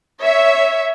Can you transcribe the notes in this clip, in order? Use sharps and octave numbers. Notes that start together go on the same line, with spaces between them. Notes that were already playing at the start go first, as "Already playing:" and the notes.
C#5 E5